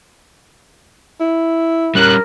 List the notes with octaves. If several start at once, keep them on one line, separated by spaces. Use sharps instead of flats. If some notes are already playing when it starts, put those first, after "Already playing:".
E4
G3 C#4 A#4 F#6